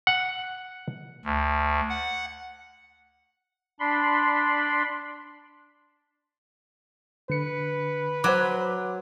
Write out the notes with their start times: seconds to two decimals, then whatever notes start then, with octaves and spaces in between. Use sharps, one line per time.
0.07 F#5
1.25 D2
1.89 F#5
3.80 D4 B5 C6
7.30 D3 B4 C#7
8.24 F#3 C5 F#5 D6